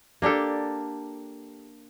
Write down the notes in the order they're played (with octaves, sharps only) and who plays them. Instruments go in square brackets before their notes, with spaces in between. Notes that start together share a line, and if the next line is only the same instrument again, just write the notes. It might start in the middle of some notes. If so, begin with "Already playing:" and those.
[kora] A#3 D4 G4 A4